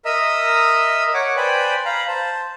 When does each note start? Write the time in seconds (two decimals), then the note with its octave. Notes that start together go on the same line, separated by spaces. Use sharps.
0.05 A#4 D#5 E5 A#5 D#6 E6
1.14 C#5 F#5 D6
1.37 B4 C5 D5 G5 G#5 B5
1.85 F5 A#5 B5
2.08 C5 A5